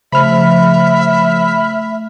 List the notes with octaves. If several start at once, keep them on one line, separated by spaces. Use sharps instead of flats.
C#3 F3 A3 E5 B5 F6